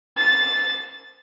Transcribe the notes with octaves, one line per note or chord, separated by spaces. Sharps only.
A6